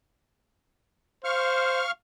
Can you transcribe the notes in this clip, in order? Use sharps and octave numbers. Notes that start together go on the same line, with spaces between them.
C5 F5 C#6 F6